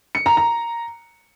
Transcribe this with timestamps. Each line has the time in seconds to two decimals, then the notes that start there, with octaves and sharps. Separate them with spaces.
0.15 C#7
0.26 A#5
0.37 A#5